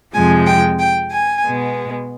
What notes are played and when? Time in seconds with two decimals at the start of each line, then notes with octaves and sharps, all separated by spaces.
0.14 F2 C3 F3 G#3 G#5
0.47 G5
0.79 G5
1.12 G#5
1.45 B2 G#3 B3